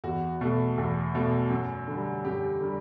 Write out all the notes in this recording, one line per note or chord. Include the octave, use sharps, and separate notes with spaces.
E2 F#4
B2 A3
E2
B2 A3
F#2
D3 G3
F#2 G4
D3 G3